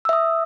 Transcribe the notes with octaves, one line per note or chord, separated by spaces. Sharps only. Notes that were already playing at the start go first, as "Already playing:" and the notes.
E5 D#6 E6